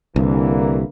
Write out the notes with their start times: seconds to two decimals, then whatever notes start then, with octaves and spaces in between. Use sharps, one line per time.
0.16 C2 D3 E3 A#3